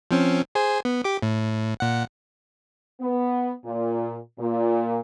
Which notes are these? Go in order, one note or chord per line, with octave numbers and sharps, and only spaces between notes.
F3 C4 C#4
G#4 C5 G#5
B3
G4 D6
A2
A#2 F#5
B3
A#2
A#2